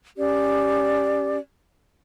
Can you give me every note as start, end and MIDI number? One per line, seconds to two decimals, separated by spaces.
0.17 1.36 61
0.17 1.36 67
0.17 1.36 74